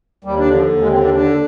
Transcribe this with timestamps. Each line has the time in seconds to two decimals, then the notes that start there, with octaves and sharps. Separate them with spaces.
0.24 D#2 G3
0.39 D4
0.46 D3
0.54 F3
0.69 D#2
0.80 G#3
0.91 D3 C4
1.03 D4
1.14 D3 D4